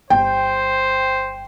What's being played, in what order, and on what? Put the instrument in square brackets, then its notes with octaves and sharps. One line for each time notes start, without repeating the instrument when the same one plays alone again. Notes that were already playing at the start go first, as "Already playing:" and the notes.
[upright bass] G1 [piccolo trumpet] C5 [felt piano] G5